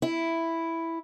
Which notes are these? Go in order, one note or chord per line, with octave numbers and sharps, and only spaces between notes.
E4